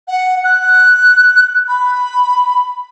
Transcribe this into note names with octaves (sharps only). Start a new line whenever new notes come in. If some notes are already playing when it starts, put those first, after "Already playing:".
F#5
F#6
B5